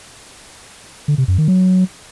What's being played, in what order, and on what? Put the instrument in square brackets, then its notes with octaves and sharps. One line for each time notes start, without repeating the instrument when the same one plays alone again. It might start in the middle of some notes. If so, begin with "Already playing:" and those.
[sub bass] D3
C3
F#2
D#3
F#3